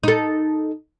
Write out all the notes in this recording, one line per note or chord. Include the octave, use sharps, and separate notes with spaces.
D#4 A4